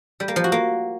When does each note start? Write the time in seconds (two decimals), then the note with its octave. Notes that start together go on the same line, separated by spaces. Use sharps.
0.20 G3
0.28 A#3
0.36 F3
0.44 F#4
0.52 A#3